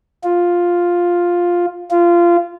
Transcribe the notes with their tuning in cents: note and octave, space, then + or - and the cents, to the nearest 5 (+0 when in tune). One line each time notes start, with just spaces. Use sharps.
F4 +5
F4 -20